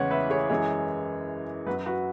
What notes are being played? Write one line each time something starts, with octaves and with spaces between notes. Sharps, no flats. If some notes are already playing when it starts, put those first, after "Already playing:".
Already playing: E2 C#3 E3 G#3 C#5 F#5
B4 E5
G#4 C#5
F#2 E3 G#3 G#4 C#5
F#2 F#3 F#4 B4
F#4 B4